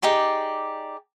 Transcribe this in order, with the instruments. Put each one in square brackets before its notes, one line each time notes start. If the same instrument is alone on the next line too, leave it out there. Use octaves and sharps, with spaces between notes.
[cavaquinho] D#4 G4 G#4 D5